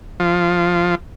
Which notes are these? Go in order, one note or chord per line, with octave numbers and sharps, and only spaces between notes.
F3